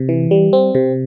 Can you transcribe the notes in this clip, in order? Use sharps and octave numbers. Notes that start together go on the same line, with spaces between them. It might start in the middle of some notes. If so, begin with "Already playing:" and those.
Already playing: C3
E3
G3
C4
C3